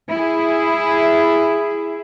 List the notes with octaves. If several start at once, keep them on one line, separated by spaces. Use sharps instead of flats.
E4 G#4